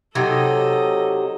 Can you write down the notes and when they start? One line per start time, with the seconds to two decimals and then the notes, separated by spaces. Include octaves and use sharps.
0.15 C3 F#3 D#4 A4 D#5